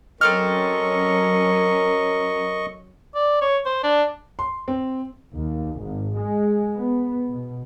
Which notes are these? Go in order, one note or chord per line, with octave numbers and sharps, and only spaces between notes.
F#3 C4 C#4 A4 A#4 D#5 C#6 F6
D5
C#5
C5
D4
C6
C4
D#2
G#1
G#3
B3
B2